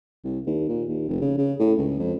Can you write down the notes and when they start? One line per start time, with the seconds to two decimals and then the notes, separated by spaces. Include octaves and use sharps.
0.24 C2
0.46 D#2
0.68 A#2
0.88 D#2
1.09 F1
1.21 C#3
1.38 C#3
1.59 A2
1.78 C#2
1.99 F2